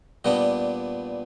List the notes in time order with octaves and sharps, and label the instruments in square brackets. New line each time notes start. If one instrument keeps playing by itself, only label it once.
[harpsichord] A#2 G3 B3 D4 D#5